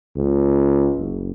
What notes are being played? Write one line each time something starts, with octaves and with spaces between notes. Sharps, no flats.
C#2
F#1